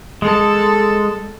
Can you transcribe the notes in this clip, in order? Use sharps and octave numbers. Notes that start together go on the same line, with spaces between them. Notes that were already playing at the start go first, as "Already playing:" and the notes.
G#3 A4